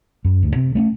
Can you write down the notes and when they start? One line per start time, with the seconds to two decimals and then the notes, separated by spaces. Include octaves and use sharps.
0.25 F#2
0.43 D2
0.56 C3
0.75 A3 C4 C#4